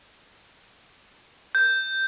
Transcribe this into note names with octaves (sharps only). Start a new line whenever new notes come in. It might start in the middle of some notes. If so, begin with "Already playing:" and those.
G6